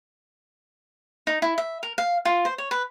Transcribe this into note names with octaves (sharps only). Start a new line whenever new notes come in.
D#4
E4
E5
A#4
F5
F4
C5
C#5
B4